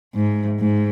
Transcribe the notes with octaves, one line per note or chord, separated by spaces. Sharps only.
G#2
G#2